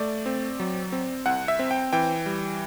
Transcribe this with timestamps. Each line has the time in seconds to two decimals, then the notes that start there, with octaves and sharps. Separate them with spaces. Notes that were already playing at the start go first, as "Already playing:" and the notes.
Already playing: A3 D5
0.26 C4
0.60 F#3
0.92 C4
1.26 C2 F#5
1.48 E5
1.59 C4
1.71 G5
1.93 E3 G5
2.26 G3